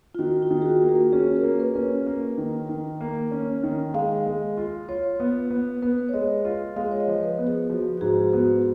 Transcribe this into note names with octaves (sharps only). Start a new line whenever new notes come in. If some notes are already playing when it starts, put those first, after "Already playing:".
F4
D#3 F#4
F4
D#3
G#4
F#4
A#3
F#4
C#4 G#4
A#4
A#3
B4
C#4
C#5
A#3
D#3
D#3
A#3
C#4
D#3
G#3 F5
G#3
F4
F4 C#5
B3
B3
B3 B4
C#5
G#3 D#5
F4 F5
G#3 F5
C#5
D#5
F3
B4
B3
G#4
F3 F#4
F#4
G#2 G#4
B3 F#4